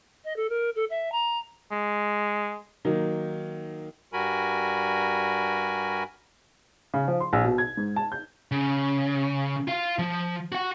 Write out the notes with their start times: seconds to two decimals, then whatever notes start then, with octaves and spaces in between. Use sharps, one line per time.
0.25 D#5
0.36 A4
0.49 A#4
0.76 A4
0.90 E5
1.12 A#5
1.71 G#3
2.85 D#3 F#3 A#3 D#4
4.13 G2 G3 F#4 A#4 G#5 B5
6.94 C#3
7.08 F3
7.20 C6
7.33 A#1
7.45 B2
7.58 G#6
7.77 G#2
7.96 A5
8.12 G6
8.51 C#3
9.68 F4 F5
9.99 F3
10.52 F#4 F#5